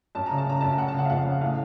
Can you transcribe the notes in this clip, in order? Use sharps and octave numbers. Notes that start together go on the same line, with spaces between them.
F#2 A5
C#3 A#5
A5
C#3 A#5
F#2 A5
C#3 F#5
A5
C#3 F#5
F5
F2 F#5
C#3
A2 F5